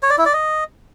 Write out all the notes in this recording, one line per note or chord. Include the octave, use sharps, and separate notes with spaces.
C#5
D5
E4
D5
D#5